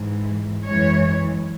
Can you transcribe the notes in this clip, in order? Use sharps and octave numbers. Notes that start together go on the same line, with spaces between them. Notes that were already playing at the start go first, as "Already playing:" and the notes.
Already playing: G#2 E3 G#3
F#2 E3 G#3 C#5